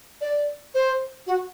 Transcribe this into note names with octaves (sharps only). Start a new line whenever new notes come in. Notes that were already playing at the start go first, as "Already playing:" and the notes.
D5
C5
F#4